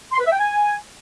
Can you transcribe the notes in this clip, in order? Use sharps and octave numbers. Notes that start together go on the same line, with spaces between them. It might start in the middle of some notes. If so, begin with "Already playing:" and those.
C6
B4
E5
G5
G#5